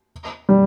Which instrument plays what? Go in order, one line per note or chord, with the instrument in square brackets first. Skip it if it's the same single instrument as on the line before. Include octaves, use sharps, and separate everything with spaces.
[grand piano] G3